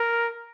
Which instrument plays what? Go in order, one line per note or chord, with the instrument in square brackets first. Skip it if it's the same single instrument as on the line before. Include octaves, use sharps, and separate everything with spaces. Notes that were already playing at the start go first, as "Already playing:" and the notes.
Already playing: [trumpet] A#4